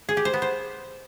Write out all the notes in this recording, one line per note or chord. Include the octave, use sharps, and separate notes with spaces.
G#4
G4
C5
B3
C5